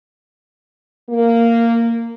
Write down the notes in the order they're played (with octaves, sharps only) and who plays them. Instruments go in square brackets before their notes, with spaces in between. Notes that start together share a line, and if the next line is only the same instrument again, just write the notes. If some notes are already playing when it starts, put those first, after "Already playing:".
[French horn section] A#3